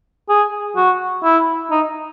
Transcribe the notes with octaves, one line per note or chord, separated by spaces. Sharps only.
G#4
F#4
E4
D#4